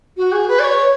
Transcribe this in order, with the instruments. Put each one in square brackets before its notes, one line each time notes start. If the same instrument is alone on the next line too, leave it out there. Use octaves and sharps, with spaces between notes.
[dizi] F#4
G#4
B4
D5
C#5